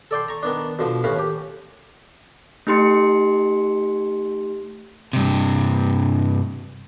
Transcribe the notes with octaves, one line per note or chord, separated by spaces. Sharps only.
A4 D5 G5 C6
A#5 C#6
D#3 B3 D4
B2 D3 F3
D#2 A2 C#4 B4 F5
G4
A3 D#4 G4 C6 C#7
G2 C3